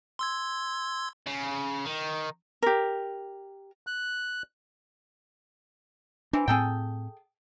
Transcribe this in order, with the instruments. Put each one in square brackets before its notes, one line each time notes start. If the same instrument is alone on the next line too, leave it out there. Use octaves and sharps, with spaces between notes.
[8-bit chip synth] C6 E6 G#6
[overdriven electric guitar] C#3
D#3
[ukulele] G4 A#4
[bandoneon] F#6
[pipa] E3 C4 [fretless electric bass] D4
[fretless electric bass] A2 C4 [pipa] G#4 A4 G5